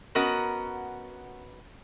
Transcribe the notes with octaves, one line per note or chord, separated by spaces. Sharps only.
B3 C#4 F#4 A#4 D#5